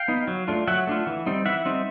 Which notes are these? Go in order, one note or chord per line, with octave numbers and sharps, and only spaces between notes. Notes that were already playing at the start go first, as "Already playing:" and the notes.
Already playing: F5 G5
B3 D#4
F#3
A3 D4 F4
F#3 E5 F#5
A3 D4 F4
E3
G3 C4 D#4
E3 E5 F#5
G3 C4 D#4